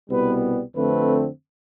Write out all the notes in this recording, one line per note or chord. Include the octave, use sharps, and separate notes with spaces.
C2 B2 G3 B3 B4
F2 D3 A3 C4 B4